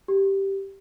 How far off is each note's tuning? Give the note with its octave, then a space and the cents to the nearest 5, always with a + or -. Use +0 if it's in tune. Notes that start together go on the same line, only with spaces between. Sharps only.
G4 -5